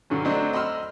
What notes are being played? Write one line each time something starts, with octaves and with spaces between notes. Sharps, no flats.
G2 D3 F#3 C#4
F#3 A3 C4 D4 C5 D#5
D#5 B5 C6 E6 F6